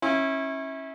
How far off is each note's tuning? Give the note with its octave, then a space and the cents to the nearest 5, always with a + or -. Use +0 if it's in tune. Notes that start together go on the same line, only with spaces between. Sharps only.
C#4 -25 E4 -20